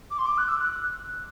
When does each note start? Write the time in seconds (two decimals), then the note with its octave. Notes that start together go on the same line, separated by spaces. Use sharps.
0.11 D6
0.18 C6
0.26 D6
0.38 F#6
0.49 E6
0.59 F#6